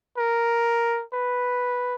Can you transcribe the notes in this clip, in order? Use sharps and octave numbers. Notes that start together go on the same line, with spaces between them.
A#4
B4